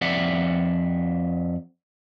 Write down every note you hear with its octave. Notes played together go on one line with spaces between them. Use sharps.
F2 D5 E5 F#5